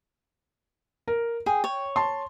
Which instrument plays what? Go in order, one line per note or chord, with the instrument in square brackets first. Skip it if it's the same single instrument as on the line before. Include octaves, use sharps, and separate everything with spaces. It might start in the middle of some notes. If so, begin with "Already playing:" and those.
[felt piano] A#4
[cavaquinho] G#4 [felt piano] G5
[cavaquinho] C#5
[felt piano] A5 C6